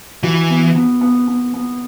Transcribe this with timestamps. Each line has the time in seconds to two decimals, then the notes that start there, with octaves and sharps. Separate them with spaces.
0.23 E3 F#4
0.50 B3
0.75 B3
1.01 B3
1.28 B3
1.54 B3